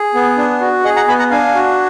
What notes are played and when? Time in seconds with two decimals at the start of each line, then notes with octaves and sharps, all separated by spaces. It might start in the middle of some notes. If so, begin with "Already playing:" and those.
Already playing: G#4
0.14 B3
0.37 D4
0.61 F#4
0.84 G#4 D#5 F#5
0.96 F#5 A#5
1.08 B3 G#5 B5
1.19 F#5 A#5
1.31 D4 F5 G#5
1.55 F#4